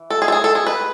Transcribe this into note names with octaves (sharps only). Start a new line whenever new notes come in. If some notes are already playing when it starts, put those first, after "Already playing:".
Already playing: E3
A4
G#4
A4
G#4
A4
G#4
B4